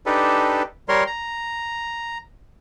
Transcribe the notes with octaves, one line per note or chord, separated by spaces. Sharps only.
D4 D#4 G4 A4 B4
G3 A#4 C#5 C6
A#5